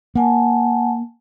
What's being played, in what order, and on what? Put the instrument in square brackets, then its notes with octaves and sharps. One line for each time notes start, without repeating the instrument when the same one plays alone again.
[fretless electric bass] A#3 [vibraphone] F#5 G#5 A5